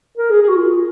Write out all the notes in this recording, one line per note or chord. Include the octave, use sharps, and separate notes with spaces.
A#4
G#4
G#4
F#4
F4
F4